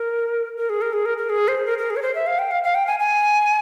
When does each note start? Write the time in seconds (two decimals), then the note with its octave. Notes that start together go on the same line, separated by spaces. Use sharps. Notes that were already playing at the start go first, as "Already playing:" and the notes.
Already playing: A#4
0.57 A#4
0.70 G#4
0.82 A#4
0.93 G#4
1.06 A#4
1.18 A#4
1.30 G#4
1.48 C5
1.66 A#4
1.78 A#4
1.90 G#4
1.96 C#5
2.02 C5
2.15 E5
2.27 F5
2.39 G5
2.51 F5
2.63 F5
2.75 G5
2.87 G#5
2.99 G#5